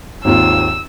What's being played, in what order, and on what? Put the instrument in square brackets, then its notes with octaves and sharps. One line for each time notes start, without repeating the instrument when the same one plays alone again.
[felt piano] G#1 D#2 F4 [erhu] E6